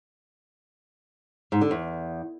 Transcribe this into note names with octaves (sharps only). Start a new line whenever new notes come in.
G#2
D3
E2